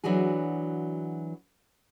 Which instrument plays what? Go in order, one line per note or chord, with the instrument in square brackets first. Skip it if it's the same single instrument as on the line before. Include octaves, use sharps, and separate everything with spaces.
[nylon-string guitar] E3 F#3 D4 F#4 G#4